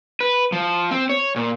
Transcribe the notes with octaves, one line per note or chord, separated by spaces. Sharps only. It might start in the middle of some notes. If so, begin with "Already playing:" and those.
B4
F3
C4
C#5
A#2